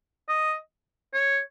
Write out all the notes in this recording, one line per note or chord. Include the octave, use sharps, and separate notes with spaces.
D#5
C#5